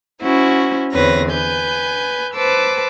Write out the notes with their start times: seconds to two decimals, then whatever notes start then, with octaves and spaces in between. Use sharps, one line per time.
0.21 C#4 E4 F#4 C5
0.93 E2 D3 C4 B4 C#5 A#6
1.31 B4 G#5 G6
2.34 B4 C5 A5 D6 E6